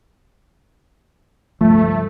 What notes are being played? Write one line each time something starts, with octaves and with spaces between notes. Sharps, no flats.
C#2 G2 F3 A3